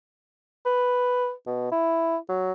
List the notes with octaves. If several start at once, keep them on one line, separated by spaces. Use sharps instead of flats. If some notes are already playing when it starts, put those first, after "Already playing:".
B4
B2
E4
F#3